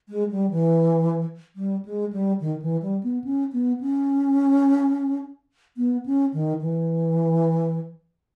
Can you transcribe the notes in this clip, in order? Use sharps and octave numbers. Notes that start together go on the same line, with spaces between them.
G#3
G3
E3
G3
G#3
G3
D#3
E3
G3
B3
C#4
B3
C#4
B3
C#4
D#3
E3